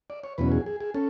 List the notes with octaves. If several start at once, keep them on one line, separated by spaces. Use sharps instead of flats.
D5
C#5
E2 B2 F#3 C#4 B4
G#4
G#4
G#4
C#4 A4